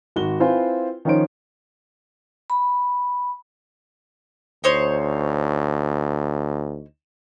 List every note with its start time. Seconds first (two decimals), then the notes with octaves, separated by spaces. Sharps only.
0.16 G#1 F#4 G7
0.40 C4 E4 F4 B4 C5 G#5
1.05 D#3 F3 C#4 D#4 C5 D7
2.50 B5
4.64 D2 D#4 C5 C#5